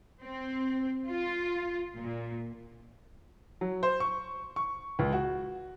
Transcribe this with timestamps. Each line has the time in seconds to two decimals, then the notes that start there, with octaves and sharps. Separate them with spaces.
0.22 C4
1.09 F4
1.97 A#2
3.61 F#3
3.83 C5
4.00 C#6
4.56 C#6
4.99 C#2
5.13 F#4